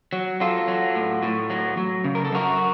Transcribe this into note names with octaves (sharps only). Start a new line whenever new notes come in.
F#3
F#3 F4 A4
F#3
A2
A2
F#3
F#3
C#3
A#4
A4
F#2 F#4 A#4